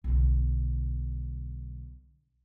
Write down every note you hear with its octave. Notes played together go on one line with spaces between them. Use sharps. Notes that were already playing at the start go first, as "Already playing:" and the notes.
B1 D3